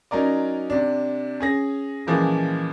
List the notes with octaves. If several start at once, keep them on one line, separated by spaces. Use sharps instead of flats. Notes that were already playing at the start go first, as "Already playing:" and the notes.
F#3 C#4 D#4 A#4 D5
C3 D4
C#4 G#4 A#6
A#2 C#3 E3 F3 G#3 A#3